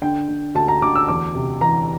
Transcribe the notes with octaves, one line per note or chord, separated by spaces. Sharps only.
D3 G5
D3
D2 A5
A#5
D2 D6
E6
E2 D6
C3
E3 A#5